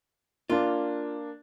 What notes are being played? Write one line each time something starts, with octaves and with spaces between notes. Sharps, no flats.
A#3 D4 F4